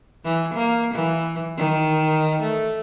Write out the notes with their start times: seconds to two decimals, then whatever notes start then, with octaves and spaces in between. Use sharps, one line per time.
0.24 E3
0.54 A#3
0.94 E3
1.57 D#3
2.41 A3